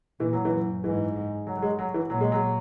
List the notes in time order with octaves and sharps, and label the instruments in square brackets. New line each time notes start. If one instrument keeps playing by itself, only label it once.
[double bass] A#2 [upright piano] E3
[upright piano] F#3
E3
[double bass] F#2
[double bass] G#2 [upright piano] E3
[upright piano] F#3
F#3
G#3
F#3
E3
[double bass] A#2 [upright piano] F#3
[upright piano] G#3
F#3